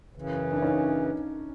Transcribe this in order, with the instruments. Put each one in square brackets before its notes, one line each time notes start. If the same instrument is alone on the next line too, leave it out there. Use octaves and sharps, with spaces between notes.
[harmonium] F#2 C#3 E3
[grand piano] D4
C#4 D#4